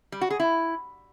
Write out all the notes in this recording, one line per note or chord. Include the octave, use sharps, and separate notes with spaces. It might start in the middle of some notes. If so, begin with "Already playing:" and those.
G3
F#4
G#4
E4